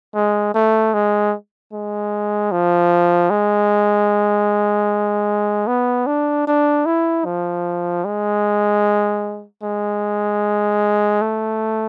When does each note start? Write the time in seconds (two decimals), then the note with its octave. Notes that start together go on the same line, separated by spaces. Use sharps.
0.15 G#3
0.54 A3
0.94 G#3
1.73 G#3
2.52 F3
3.30 G#3
5.67 B3
6.07 D4
6.47 D4
6.86 E4
7.25 F3
8.05 G#3
9.63 G#3
11.22 A3